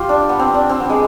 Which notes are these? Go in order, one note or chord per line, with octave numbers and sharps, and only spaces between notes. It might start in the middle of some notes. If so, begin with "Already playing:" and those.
Already playing: F4 G4
D4
B3
C4
D4
C4
B3
G#3